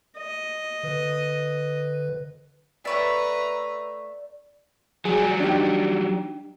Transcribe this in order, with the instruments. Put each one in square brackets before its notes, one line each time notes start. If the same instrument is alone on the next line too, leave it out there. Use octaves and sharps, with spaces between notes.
[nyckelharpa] D#5
[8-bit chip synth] D3 B4
[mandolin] A3 C#5 E5 [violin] B4 A#5 [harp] D5
[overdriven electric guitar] F#3 G3 [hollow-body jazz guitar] G#4
[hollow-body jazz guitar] D4 D#4 G4